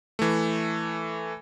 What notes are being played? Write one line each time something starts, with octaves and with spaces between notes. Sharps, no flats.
E3 A3